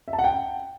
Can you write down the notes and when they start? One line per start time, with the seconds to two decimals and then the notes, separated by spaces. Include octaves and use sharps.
0.08 E5
0.13 A5
0.19 F#5
0.24 G5